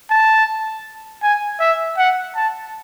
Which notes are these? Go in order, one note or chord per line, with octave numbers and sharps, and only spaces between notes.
A5
G#5
E5
F#5
A5